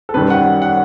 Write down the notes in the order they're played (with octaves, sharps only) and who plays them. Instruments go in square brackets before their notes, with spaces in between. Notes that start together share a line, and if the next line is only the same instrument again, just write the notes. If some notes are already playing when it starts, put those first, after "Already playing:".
[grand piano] A4
F#2 D#3 G3 B4
F#5
F#5